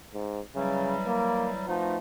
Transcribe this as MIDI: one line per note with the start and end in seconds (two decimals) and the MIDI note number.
0.14 0.40 44
0.55 0.95 49
0.55 1.66 52
0.55 1.66 54
0.55 1.66 55
1.06 1.50 58
1.67 1.97 47
1.67 1.97 53
1.67 1.97 57
1.67 1.97 63